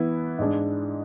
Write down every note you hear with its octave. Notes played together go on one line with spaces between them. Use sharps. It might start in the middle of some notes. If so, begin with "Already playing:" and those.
Already playing: E3 B3 E4
G#2 G#3 D4